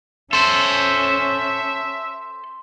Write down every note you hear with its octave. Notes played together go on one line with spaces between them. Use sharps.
C#4 A4 C5 E5 C6